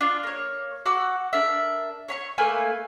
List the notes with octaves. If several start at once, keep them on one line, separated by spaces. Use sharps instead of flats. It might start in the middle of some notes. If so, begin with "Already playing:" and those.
D4 F4
A#3 C#5
F#4 F#5 D6 E6
D4 A#4 E5
C#5 B5 C#6
A3 A#3 B4 G#5